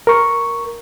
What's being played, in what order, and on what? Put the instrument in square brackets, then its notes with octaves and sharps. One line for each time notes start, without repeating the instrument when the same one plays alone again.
[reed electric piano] A#4 C#6